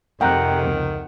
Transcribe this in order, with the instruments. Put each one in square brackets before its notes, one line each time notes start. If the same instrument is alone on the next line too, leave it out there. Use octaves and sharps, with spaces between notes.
[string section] F2 C3 [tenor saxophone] D#3 [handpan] F#5 [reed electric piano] G5 A#5 F#6
[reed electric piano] C#2